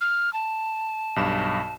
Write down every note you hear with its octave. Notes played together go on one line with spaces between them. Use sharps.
F6
A5
B1 G2 E7